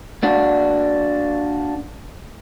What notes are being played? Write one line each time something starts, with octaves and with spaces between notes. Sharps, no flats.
A#3 D4 F#4